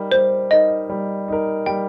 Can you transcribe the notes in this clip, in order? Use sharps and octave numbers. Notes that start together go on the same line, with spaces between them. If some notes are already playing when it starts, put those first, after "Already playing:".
Already playing: G3 D#4 A#4
G3 C5
D#4 A#4 D#5
G3
D#4 A#4
G3 G5